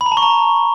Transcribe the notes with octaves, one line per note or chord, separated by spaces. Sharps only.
B5
A#5
A5
C#6
A#5